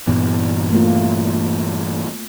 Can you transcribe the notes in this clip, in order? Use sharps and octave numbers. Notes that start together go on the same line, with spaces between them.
G2 A#2 E3 B3
A3 A#3 F4